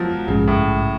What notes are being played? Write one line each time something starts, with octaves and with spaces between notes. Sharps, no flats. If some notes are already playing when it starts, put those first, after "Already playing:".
Already playing: D#3 F3 F#3 G#3 B3
A#1 G#2 C#3 F3 G#3
A2